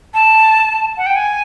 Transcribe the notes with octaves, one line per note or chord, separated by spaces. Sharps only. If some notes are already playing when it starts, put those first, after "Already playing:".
A5
F#5
G5
G#5